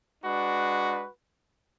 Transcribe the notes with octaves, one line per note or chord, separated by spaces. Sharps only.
G#3 D4 F#4 B4